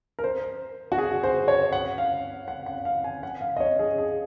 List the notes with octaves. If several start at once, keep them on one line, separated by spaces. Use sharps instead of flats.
A#4
C5
F#4
G#4
C5
C#5
F#5
F5
F#5
F#5
F5
G#5
F#5
F5
D#5
C#5
G#4
G#4